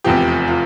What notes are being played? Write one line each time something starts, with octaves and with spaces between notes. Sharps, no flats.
F1 E2 C3 F3 G4
F4